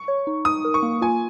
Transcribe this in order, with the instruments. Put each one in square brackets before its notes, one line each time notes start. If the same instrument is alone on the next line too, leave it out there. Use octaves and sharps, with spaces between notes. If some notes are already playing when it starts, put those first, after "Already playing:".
Already playing: [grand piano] C#6
[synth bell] C#5
D#4
[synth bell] D#4 [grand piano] D#6
[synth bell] A#4
[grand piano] C#6
[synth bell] A#3
[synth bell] F4 [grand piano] G#5